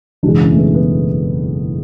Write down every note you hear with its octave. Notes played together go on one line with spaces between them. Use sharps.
F#1 E2 B2 G#3 D4
C#4
A3
B3
B3